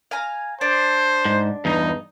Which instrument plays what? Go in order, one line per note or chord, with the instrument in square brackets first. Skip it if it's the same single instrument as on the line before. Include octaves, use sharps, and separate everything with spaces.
[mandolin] F5 G#5 A#5
[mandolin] D4 [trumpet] C5
[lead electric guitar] G#2
[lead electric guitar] E2 G2 [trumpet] D#4